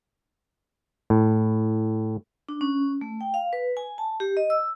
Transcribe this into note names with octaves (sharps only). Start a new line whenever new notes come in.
A2
D4
C#4
A3
G5
F5
B4
G#5
A5
G4
D#5
E6